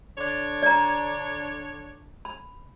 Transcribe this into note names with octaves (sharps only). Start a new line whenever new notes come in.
D3 D4 C#5
D5 A#5
B5